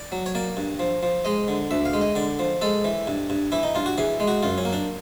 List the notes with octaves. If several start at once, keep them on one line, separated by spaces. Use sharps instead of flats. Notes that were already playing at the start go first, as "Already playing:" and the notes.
Already playing: D5
F#3
C#5
A#3 D5
G2
F3
F3
G#3 D#5
D3
D2 E5
F5
G#3
D#5
D3 D5
F3
G#3 A4
E3
G2
G2
E3 E4
D#4
G2 F4
F#4
E3 G#4
G#3
F#4
F#2 F4
C#4
A#3
D4